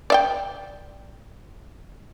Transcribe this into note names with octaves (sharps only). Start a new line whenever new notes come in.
D5 E5 G5